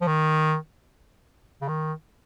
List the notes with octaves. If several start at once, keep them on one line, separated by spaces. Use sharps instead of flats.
F3
D#3
C#3
D#3